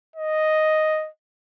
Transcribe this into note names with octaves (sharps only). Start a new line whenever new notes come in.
D#5